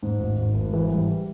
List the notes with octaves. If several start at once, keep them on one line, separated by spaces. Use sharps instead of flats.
G#2
G#1
G#1
G#1
E3
G3